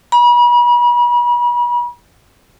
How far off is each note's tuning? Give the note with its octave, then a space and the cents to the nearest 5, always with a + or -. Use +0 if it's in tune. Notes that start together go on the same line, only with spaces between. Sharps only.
B5 -40